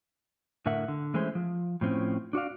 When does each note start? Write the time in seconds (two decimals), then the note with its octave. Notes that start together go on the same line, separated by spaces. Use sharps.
0.66 A2 D3 A#4 E5 F#5
0.88 D3
1.14 E3 G#3 A3 C#4 G#4 C5
1.35 F3
1.81 A2 F3 C4 C#4
2.33 D4 F#4 D5 F5